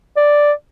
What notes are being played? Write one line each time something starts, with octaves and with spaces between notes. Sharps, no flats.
D5